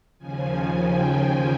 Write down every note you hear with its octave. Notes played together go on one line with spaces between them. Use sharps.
D#2 C#3 F3 G#5
G5
G#5